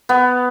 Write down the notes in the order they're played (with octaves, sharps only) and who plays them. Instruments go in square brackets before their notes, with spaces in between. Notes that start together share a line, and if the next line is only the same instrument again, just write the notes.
[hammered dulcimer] B3